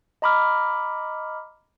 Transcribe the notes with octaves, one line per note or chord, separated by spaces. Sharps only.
D#5 A#5 B5 D6 F6